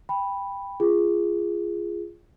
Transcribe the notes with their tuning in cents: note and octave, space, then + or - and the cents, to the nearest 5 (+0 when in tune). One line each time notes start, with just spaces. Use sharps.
G5 +20 B5 +0
F4 -20 G#4 -10